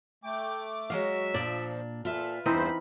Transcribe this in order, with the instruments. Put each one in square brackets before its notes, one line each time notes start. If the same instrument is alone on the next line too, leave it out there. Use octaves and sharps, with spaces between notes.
[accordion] A3 D6 [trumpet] G5
[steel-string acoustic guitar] F#3 G#3 F#4 [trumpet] E5 [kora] F5
[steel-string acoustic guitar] A#2 D4 [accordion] F3 [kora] D5
[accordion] A#2 [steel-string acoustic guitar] F4 B4 E5 [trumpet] A4
[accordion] E2 G2 C5 [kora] E3 C4 D#4 [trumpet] B5